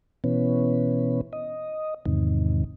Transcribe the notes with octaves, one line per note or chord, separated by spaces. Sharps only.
B2 E3 B3 C#4
D#5
E2 G#2 C3 D#3